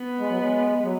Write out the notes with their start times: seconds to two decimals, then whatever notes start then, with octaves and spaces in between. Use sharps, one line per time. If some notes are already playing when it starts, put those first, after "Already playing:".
Already playing: B3
0.19 G#3
0.29 F#3
0.39 G#3
0.78 G#3
0.84 F#3